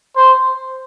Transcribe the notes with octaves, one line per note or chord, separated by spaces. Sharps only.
C5